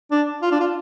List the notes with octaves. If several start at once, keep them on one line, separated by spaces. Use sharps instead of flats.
D4
F4
D4
F4